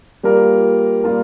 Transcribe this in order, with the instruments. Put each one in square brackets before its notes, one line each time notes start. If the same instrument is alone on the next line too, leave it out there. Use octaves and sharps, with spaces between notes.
[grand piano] G3 A#3 F4 A#4
G3 A#3 F4 A#4